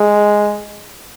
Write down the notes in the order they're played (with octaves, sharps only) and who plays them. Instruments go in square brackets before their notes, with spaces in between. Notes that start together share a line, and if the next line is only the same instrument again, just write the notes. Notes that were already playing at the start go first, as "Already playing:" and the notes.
Already playing: [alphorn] G#3